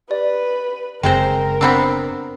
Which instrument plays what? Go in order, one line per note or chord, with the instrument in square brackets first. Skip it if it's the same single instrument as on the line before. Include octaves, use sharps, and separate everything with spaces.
[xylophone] G4 D5 [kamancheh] B4
[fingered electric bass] F#1 [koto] G#3 C4 C5 [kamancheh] A#4 [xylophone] G5 A#6
[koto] B3 C4 D4 [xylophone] B5 E6